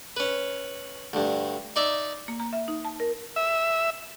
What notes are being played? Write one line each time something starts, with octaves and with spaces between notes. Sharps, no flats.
C#4 B4
D2 G2
D#4 D5 E5
A#3
A#5
E5
D#4
A5
A#4
E5